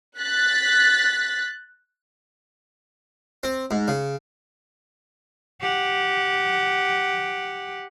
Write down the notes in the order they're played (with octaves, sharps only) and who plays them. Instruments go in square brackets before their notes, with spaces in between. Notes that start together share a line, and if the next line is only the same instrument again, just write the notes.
[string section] F#6 A6 B6
[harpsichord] C4
G#2
C#3
[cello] G4 F#5